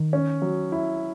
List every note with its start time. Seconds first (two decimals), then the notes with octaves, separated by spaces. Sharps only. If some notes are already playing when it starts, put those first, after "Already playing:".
Already playing: D#3
0.13 C#4
0.42 F#3
0.72 E4